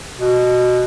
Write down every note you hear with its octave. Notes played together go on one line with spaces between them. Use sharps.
B2